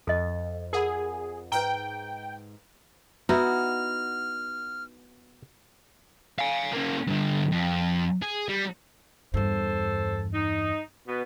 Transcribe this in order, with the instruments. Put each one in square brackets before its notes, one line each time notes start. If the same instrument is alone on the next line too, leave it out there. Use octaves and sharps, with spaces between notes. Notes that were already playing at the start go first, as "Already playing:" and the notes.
[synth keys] F2 [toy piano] A4 D#5
[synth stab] G#4 [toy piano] A#4 F#5 B5
[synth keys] G#2 [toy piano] B4 C5 A#5 [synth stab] G5
[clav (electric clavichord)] B3 [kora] D#4 E4 E5 [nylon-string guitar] F#4 [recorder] F6
[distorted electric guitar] F5 G#5
A#3 C#4
G2 D3
F2
G#4
G3
[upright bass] E2 G2 [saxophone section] A4 C5
[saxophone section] D#4
B2 B3